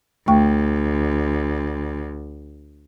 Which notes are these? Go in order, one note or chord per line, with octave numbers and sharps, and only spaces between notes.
D2 A3 G5 C#6